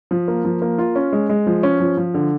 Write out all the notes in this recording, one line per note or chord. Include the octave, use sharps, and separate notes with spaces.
F3
A#3
F3
A#3
F4
C#4
G#3
G#3
F3
C#4
F3
F3
D3